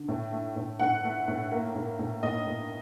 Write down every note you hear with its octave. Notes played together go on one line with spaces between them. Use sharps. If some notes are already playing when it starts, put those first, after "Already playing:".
Already playing: D3
A2
A3
A2
A2 F#5
A3
A2
A#3
A2
A2
A2 D#5
A2